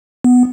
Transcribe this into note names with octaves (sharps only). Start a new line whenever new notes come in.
B3